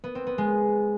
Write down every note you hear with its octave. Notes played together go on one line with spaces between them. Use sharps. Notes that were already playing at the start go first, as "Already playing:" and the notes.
B3
C4
B3
G#3